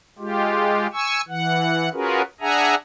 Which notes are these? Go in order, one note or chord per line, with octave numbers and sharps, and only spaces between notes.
G#3 F4 G4
G#5 C#6 E6
E3 F#5
C#4 F4 F#4 G#4 A#4 B4
D4 G#4 E5 F#5 G#5 A#5